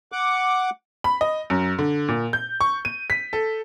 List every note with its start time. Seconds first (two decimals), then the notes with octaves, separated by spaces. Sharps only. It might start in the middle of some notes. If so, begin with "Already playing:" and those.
0.12 F#5 D6
1.04 B5
1.21 D#5
1.50 F#2
1.79 D3
2.08 A#2
2.33 G6
2.61 C#6
2.85 D#7
3.10 B6
3.33 A4